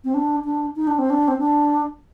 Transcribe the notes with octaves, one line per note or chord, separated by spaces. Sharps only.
C4
D4
D4
D#4
D4
C4
D4
C4
D4